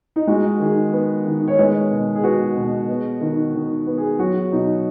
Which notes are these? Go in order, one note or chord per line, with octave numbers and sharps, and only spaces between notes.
D#4
G#3 F#4
D#3 G#4
B3
D#3
C#5
G#3 B4
B2
G#4
B3 F#4
B2
B3
D#3
D#3
B3
G#4
F#3 F#4
B2 D#4